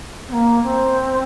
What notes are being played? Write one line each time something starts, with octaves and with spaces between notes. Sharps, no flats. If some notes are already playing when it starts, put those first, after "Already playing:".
C4
A#3
C4